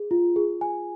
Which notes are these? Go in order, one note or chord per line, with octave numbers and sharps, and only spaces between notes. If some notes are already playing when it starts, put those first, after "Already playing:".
Already playing: G#4
F4
G#4
G#5